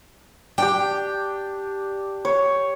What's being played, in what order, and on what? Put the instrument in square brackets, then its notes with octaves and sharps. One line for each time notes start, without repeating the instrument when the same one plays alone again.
[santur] D4 G4 [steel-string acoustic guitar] G5
[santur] C#5